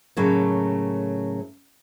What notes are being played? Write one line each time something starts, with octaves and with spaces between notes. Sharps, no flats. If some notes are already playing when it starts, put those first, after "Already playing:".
A2 C#3 F#3 A3 A#3